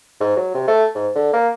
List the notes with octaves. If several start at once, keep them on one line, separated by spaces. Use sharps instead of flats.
G#2
F#3
C3
A3
G#2
D3
A#3